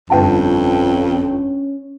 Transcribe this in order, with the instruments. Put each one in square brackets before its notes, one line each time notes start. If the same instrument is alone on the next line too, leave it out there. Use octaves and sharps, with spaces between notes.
[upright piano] G1 G5 A5 [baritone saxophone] F2 [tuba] C#4